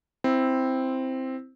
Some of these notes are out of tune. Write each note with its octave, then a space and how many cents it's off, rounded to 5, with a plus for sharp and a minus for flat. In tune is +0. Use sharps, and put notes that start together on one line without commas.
C4 +0 E4 +0